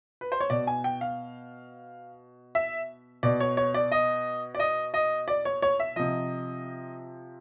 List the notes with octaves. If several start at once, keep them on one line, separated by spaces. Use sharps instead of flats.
B4
C5
C#5
B2 D5
G#5
G5
F5
E5
B2 D5
C#5
C#5
D5
D#5
D5
D#5
D#5
D5
C#5
C#5
E5
C3 F3 D#5